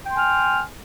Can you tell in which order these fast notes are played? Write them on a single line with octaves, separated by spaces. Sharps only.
G5 C6 G#5 F6